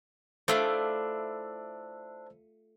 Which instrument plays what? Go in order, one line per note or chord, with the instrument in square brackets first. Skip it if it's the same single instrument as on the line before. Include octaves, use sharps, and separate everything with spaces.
[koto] A3 F4 [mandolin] D4 E4 D6 [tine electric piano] C5 E6